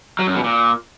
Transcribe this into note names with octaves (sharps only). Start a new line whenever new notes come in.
F#3
F#2
B2
A#2